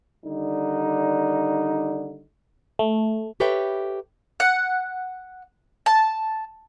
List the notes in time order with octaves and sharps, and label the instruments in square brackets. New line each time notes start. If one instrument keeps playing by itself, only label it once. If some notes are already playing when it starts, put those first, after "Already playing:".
[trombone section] D3 D#3 G3 D#4
[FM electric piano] A3
[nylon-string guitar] G4 A4 B4 C#5 E5 G5
[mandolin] F#5
A5